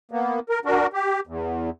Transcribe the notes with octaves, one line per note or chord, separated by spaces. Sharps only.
A#3 B3
A#4
D4 F#4 A#4
G4
E2